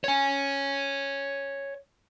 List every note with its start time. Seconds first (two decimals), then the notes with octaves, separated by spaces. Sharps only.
0.04 C#5 G#5